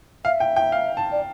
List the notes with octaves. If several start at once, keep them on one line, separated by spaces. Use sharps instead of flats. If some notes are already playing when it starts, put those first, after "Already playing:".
E5 F5
G5
G5
F5
A5
D5